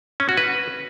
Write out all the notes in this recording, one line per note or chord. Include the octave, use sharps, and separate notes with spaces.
C#4
F#4
B4